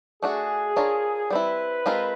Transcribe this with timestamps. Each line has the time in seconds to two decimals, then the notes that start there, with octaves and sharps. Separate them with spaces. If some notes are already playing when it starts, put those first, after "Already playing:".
0.22 A3 D4 F#4 G#4
0.76 D4 F4 A#4 C#5
1.30 G3 C4 E4 B4
1.86 G#3 C4 F4 A#4